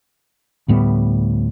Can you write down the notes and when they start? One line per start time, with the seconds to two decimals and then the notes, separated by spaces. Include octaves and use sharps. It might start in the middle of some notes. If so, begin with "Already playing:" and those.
0.68 D2 A2 G3 B3